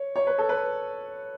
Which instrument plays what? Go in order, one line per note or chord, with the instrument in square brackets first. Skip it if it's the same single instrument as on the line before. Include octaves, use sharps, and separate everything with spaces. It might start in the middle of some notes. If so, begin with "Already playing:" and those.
Already playing: [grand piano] C#5
C#5
B4
A4
B4